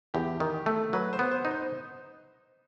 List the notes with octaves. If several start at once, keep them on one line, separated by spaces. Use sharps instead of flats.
E2 G4
D#3
A3
F#3 B4
C5
B3
C5
D#4
C5